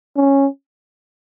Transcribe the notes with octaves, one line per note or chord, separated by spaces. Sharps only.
C#4